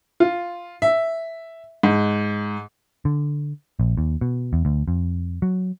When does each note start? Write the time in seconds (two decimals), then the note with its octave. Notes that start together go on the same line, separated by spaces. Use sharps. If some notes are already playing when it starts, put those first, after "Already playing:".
0.20 F4
0.82 E5
1.83 G#2
3.05 D3
3.80 A#1
3.97 D#2
4.21 B2
4.53 E2
4.65 D2
4.88 F2
5.42 F#3